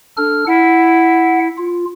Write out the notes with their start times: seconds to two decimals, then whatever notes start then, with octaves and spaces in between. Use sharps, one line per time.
0.17 D4 A4 F6
0.47 E4 F#5
1.57 F4